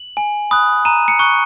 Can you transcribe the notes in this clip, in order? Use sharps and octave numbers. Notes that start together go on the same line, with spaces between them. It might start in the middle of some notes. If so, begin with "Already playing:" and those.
Already playing: F#7
G#5
B5 D#6 F#6
A#5 D#7
C#7
C#6 F#6